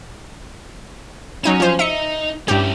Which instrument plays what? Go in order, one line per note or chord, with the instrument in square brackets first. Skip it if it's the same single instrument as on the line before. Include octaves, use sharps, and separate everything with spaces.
[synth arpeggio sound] F#3 D#4 D#7 [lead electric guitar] C#4
[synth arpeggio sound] F3 C5
[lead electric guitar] D#4 [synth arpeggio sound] E5 C#7
[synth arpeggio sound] G2 G4 [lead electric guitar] C#4 E4